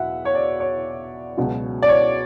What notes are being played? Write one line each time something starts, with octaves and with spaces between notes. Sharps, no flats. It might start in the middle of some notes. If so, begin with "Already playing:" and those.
Already playing: E2 B2 F#3 E5 F#5
C#5
D5
C#5
C#2 B2 F#3
D5
C#5